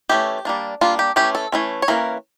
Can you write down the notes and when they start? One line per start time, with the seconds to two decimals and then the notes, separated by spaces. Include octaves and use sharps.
0.09 E3 A3 C#4 G4
0.45 G3 A#3 D4
0.81 G3 A#3 D4 F4
0.99 G4
1.16 E3 A3 C#4 G4
1.35 A4
1.52 E3 A3 C#4
1.82 C#5
1.88 E3 A#3 C#4 A#4